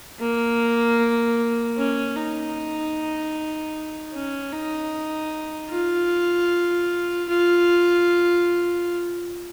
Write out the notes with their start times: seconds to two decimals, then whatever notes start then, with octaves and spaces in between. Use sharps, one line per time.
0.20 A#3
1.78 C#4
2.16 D#4
4.14 C#4
4.52 D#4
5.70 F4
7.29 F4